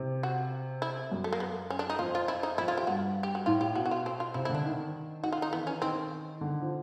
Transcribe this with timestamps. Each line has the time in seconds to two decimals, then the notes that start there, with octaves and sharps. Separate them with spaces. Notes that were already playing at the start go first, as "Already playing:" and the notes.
Already playing: C3
0.23 F#4
0.82 E4
1.12 F#2
1.24 A3
1.33 A#3
1.40 B3
1.70 C#4
1.79 D4
1.90 D#4
1.99 F2 F4
2.15 F4
2.28 E4
2.43 D#4
2.58 F2 E4
2.68 F4
2.77 G4
2.87 G2 F#4
3.23 G4
3.35 F#4
3.46 A2 F4
3.61 G4
3.75 B2 F#4
3.86 F#4
3.91 F4
4.06 C4
4.20 F4
4.34 C3 E4
4.45 E4
4.49 D3
4.55 D4
4.64 D#3
5.23 D#3 F#4
5.32 F4
5.42 D#4
5.52 E3 B3
5.67 C#4
5.82 D#3 C4
6.41 D3
6.62 F3